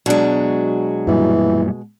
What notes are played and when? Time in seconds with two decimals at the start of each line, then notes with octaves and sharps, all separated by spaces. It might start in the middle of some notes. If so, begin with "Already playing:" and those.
0.06 B2 F#3 G#3 D4
1.07 F#2 A#2 E3 G3